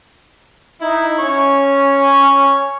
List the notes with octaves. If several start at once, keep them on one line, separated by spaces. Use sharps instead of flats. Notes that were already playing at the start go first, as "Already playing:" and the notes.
D#4 E4
C#4 C#5